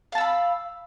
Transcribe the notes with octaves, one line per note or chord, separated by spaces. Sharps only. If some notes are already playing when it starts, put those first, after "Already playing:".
F5 A5 B5 E6